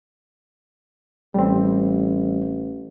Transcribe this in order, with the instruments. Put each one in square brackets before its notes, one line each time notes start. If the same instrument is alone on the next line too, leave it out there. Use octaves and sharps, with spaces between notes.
[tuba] A1 [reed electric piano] G3 C4